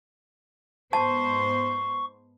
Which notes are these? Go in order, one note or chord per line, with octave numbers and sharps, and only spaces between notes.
G#2 B3 C5 A5 C#6